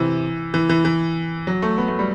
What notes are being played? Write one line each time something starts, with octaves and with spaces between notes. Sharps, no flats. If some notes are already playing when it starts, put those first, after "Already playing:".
Already playing: C3 E3
E3
E3
E3
F#3
A3
B3
A3
G3